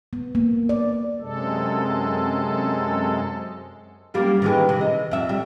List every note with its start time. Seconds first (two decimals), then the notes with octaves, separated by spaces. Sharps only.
0.13 B3
0.35 A#3
0.69 D5
1.20 F#2 C3 G#3 A4
4.14 F#2 G3 A#3
4.42 D#3 E3 G#3
4.69 C3
4.81 D#5
5.11 F2 E5
5.29 G3